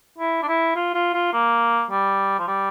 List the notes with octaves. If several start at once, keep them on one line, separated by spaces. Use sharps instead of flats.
E4
D4
E4
F4
F4
F4
A#3
G3
F3
G3